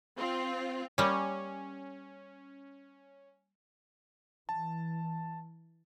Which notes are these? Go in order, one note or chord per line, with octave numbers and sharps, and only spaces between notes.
C4 F4
G3 A#3 C#4
E3 A5